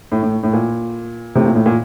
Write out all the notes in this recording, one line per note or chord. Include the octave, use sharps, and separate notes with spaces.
A2
A2
A2
A#2
A2 C3
A#2
A2
A#2